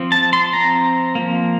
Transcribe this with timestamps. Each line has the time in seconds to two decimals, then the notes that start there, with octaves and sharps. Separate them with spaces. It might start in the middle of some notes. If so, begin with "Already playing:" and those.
Already playing: F3 C4
0.12 A5
0.33 C6
0.53 F3 C4 A#5
1.15 F3 A#3